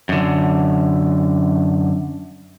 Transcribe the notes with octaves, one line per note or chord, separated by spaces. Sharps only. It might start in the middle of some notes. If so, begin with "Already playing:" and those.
F#2 D3